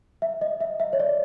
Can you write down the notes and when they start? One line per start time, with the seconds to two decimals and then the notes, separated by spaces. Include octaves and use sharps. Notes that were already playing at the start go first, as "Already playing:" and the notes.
0.22 E5
0.41 D#5
0.61 E5
0.80 E5
0.93 C#5
1.00 D5